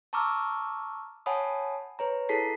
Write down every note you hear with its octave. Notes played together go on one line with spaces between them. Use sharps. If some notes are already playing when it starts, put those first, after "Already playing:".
A5 A#5 C#6 D6 E6 F6
C#5 F#5 G#5 A5 B5 D#6
B4 C#5 A#5
E4 G#4 A4 A5 B6 C7